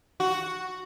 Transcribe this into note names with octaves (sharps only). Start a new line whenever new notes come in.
F#4